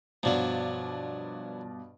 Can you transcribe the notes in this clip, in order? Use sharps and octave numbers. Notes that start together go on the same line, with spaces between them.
G2 B2 F3 F#3 F4 D5